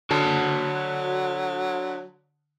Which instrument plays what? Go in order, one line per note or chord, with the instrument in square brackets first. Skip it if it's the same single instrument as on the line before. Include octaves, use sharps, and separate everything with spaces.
[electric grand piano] D3 [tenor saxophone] F#3 [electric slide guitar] F#4 A5